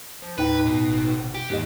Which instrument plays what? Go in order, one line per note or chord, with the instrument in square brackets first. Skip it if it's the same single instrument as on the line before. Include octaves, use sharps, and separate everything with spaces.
[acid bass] F3
[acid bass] D#2 [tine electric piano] A2 D#4 G5 [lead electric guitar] B4
[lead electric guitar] B2
[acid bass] G1
[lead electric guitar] G4
[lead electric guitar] D#2 [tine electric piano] G#2 G4 D#5